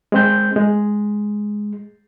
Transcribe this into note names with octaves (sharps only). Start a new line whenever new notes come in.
G#3 C4 G6
G#3